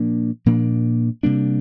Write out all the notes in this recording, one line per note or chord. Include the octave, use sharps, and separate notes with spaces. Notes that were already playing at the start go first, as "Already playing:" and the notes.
Already playing: A#2 F3 A#3 D4
A#2 F3 A#3 D4
C3 G3 A#3 D4